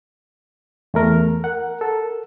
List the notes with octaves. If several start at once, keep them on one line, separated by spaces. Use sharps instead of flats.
E2 A3 A#4
A#4 F#5
A4